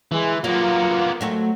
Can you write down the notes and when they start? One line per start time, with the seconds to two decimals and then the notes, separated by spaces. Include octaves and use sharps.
0.12 E3 G#3
0.44 F#3 A#3 B3 F4
1.21 F#3 A3 C4